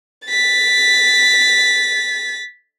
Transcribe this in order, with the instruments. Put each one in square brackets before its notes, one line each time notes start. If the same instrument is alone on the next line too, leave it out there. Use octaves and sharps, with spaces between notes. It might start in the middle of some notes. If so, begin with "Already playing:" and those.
[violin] A6 B6